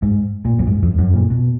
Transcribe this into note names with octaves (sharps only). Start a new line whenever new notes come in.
G#2
A#2
F#2
G#2
F2
F#2
A#2
B2